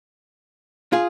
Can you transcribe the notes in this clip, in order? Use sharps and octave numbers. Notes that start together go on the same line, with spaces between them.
F4 G#4